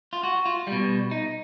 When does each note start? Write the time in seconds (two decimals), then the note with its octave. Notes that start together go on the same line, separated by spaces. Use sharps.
0.13 F4
0.23 F#4
0.46 F4
0.67 B2 G3
1.11 D#4